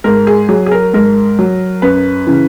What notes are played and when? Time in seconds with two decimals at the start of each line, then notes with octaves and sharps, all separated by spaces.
0.04 G#2 A#4
0.27 G#4
0.49 F#3 G#4
0.66 G#4
0.71 A#4
0.94 G#2 A#4
1.39 F#3
1.82 F#2 B4
2.27 C#3 E3